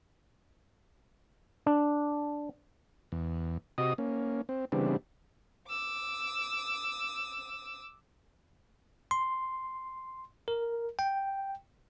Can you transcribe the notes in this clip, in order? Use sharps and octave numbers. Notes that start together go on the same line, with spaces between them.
D4
E2
C3 F#4 D#5 D#6
A#3 C#4
C4
C#3 E3 G3 B3 C4 D4
D6 E6
C6
A#4
G5